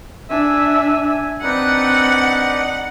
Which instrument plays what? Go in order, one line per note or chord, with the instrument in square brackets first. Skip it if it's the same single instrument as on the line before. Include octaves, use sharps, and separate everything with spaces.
[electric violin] D4 E5 [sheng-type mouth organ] G#5
[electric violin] C4 [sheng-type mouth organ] D4 D#4 B4 [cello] F#5